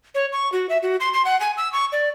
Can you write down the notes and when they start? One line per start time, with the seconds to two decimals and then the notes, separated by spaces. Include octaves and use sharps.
0.15 C#5
0.32 C#6
0.52 F#4
0.69 E5
0.83 F#4
1.00 C6
1.13 C6
1.25 F#5
1.40 G#5
1.57 E6
1.73 C#6
1.92 D5